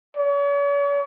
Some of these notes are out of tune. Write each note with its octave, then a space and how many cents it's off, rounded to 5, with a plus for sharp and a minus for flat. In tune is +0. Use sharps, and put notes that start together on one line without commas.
C#5 +40